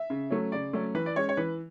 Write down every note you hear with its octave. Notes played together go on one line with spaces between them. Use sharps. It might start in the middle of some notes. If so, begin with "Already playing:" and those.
Already playing: E5
C#3
F#3 A3 C#4
C#3 D5
F#3 A3 C#4
E3 B4
D5
G#3 C#4 C#5
C#5
E3 B4